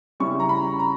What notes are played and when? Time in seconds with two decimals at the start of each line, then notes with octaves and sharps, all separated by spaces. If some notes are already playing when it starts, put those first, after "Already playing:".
0.20 C#3 G3 C#4 E4 C#6
0.39 A#5
0.49 B5
0.79 A#5